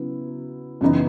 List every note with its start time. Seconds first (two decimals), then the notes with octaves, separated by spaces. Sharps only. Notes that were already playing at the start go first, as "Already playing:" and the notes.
Already playing: C#3 F#3 B3 E4
0.81 F#2 C#3 E3 B3 D#4